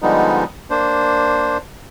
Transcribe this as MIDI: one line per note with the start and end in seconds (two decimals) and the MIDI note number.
0.02 0.44 50
0.02 0.44 53
0.02 0.44 55
0.02 0.44 56
0.02 0.44 59
0.02 0.44 63
0.70 1.57 58
0.70 1.57 62
0.70 1.57 72